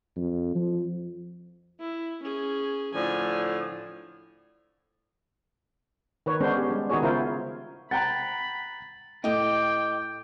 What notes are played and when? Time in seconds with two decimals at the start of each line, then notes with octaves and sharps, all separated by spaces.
0.16 F2
0.55 F3
1.79 E4
2.23 C#4 G#4
2.94 A2 D3 F3 G#5
6.26 D#3 B4 C#5
6.40 D3 G#3 B3 C#4 D4 C5
6.56 G4
6.70 G3 G#3 D4
6.90 D#3 B3 D#4 F#4 G#4 C#5
7.03 C#3 E4 F4 A#4 C5
7.91 F#5 G5 A#5 B5 A6
9.24 A2 G4 D#5 G5